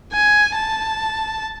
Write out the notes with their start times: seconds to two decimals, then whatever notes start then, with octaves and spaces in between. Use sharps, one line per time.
0.13 G#5
0.55 A5